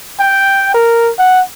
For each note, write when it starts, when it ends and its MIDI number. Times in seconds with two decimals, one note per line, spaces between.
0.20 0.73 79
0.74 1.11 70
1.18 1.41 78